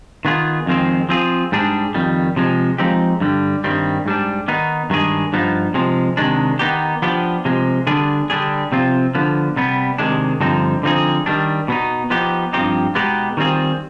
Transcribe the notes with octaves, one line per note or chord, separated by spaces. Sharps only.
D#3 B3 F4 G#4
F2 D#3 G#3 C4
F3 C4 F4 G#4
G#2 G3 D4 G#4
F2 D#3 G3
C3 F3 G#3
F3 G#3 C4 D#4 G4
G2 D3 G3
G2 D#3 G3 C4
G#2 G3 D4
D#3 B3 D#4
G2 D#3 G#3 D4 G#4
G2 F3 B3 D#4
C3 F3 G#3
C3 D#3 G#3 D4
D#3 B3 D#4 G4
F3 B3 D4 G4
C3 F3 G#3
D3 G3 B3 D4 G#4
D3 G3 D4 G#4
C3 F3 C4 F4
D3 F3 B3
C3 G3 B3
C3 D#3 G#3 D4
G2 D3 F3 C4 D#4
D3 F3 C4 D#4 G#4
D#3 G3 D4
B2 B3 D#4
F3 B3 D#4 G4
G2 F3 C4 D#4 G4
B2 G#3 B3 D#4 G4
D#3 G3 C4 F4 G#4